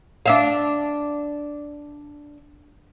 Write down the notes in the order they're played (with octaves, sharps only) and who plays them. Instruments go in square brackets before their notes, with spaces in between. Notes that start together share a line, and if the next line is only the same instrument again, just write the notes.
[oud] D4 E5 F5